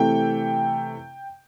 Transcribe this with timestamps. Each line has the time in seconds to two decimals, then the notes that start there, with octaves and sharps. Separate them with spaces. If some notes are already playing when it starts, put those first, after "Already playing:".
Already playing: C3 E3 A3 G5